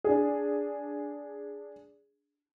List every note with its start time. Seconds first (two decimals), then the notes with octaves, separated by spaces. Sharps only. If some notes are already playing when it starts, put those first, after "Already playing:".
0.04 D4 G#4